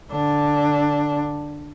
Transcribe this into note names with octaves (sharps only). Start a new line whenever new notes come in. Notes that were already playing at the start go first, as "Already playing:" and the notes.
D3 D4